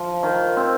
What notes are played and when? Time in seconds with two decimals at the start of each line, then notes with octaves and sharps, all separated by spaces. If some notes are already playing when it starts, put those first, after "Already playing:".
Already playing: F3
0.23 D#3
0.57 C4